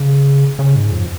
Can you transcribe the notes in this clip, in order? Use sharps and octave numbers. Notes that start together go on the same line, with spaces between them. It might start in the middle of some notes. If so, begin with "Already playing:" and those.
Already playing: C#3
C#3
G#2
F2